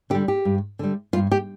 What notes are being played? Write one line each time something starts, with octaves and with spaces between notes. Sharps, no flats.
D3 G3 G4
G4
G2
D3 G3
G2 F4
G4